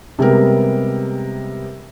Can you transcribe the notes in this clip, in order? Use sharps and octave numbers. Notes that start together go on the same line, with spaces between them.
C3 G3 G#3 B3 A#4